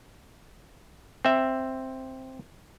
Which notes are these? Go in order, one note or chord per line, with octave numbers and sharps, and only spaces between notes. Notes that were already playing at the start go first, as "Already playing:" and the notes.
C4 E5